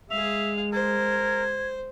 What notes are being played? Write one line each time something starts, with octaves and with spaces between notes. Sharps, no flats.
G#3 G#4 E5 F5 F7
A#4 C5 G#6